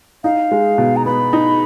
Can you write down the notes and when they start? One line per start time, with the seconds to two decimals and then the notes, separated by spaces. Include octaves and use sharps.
0.24 D#4 F5
0.52 G#3
0.78 B2
0.96 A#5
1.05 B3 B5
1.33 D#4